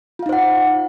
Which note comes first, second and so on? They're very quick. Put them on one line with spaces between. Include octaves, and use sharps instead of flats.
F4 F5 D#4 C5 F#5